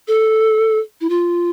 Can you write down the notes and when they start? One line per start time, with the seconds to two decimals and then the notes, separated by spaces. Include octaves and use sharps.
0.08 A4
1.01 E4
1.09 F4